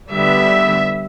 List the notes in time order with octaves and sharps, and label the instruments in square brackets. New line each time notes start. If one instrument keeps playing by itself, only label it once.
[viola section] D3 G3 B3 E5